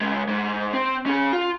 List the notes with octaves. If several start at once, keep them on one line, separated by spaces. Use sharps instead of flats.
C#2 G#3
G#2 G#3
C4
C#4 G#4
F4